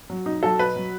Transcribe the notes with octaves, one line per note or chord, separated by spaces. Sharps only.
F#3
B2 D#4
F#3 A4
B2 B4
F#3